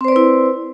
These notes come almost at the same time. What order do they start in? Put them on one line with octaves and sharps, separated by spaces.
C4 C5 D5 B4 E4